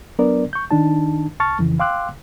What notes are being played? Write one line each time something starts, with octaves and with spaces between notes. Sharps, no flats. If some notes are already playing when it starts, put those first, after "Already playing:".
F#3 B3 D4 A#4 D5
C#6 G6
D#3 D4 D#4 A5
C2 A5 C#6 F6 A6
F2 C#3 E3
F5 G5 C6 D6 E6 F#6